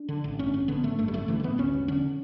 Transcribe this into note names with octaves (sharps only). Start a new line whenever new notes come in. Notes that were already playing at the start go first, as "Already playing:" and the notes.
Already playing: D4
D3
A1
G2 C#4
A1 C#4
D3 B3
A1 A3
G2 A3
G3
A1 A3
D3 E3
A3
A1 B3
D2 C#4
E1
D3 C#4